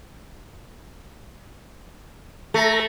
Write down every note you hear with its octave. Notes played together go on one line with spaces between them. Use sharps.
A3 A4 A#5